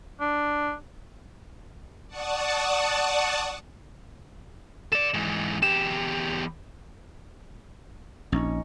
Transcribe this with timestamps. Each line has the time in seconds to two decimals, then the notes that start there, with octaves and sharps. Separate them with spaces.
0.20 D4
2.08 D5 F#5 A5 C#6 D#6
4.92 A4 D5 E7
5.14 G#2 E3
5.62 E2 G4 E7
8.32 A#1 C#4 D#4 C#5